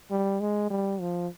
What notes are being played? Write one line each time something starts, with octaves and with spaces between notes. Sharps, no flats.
G3
G#3
G3
F3